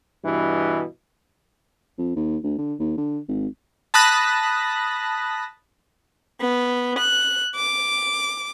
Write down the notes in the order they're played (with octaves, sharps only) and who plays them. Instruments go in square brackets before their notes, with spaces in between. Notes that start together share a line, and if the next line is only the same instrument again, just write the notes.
[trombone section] G2 B2 E3
[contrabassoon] F2
D#2
D2
D3
D#2
D3
G#1
[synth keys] A5 B5 D#6 F#6 A#6
[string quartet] B3
F#6
D6